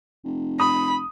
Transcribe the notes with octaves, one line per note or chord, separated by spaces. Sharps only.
F1
B5 D#6